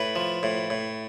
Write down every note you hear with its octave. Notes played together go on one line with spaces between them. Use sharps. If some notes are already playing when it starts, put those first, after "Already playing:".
Already playing: A2 B4
F3
A2
A2